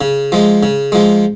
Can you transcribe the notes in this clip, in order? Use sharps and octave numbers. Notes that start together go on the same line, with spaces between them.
C#3
F3 G#3
C#3
F3 G#3